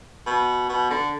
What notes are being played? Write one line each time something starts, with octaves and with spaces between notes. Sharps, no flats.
B2
B2
D3